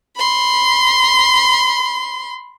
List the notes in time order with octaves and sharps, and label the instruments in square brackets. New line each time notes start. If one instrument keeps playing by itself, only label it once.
[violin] B5 C6